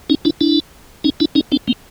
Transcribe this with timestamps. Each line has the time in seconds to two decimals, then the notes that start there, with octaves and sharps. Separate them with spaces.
0.10 C#4 D#4
0.25 D4 E4
0.41 D4 E4
1.04 C#4 D#4
1.20 D4 E4
1.35 C#4 D#4
1.52 C4 D4
1.68 A#3 C4